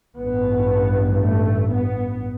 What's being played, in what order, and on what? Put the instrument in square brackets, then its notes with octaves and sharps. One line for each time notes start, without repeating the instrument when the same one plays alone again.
[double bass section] A1 G2 B3
A3
B3